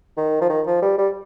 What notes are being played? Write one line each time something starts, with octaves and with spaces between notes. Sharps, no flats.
D#3
F3
D#3
F3
G3
G3